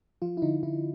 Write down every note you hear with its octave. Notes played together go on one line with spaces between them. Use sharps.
F3 F4
E4
D3 D#4
D3 E4